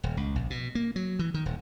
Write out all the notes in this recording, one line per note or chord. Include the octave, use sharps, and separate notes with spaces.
D#1
C#2
A#1
B2
A#3
F#3
E3
D#3
D#1